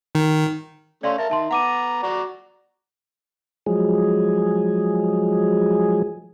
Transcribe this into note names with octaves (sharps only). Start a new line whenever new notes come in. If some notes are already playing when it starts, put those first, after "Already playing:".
D#3
A3 C#4 D5 F5 C6
A#4 E5 A5
D#3 E5 A5 C6
B3 F#5 A#5 D6 D#7
F#4 D5 A#5
F3 F#3 G#3 G#4